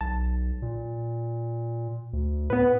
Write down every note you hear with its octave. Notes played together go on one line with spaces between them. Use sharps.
B1 A5
A#2
D2
A2 B3 B4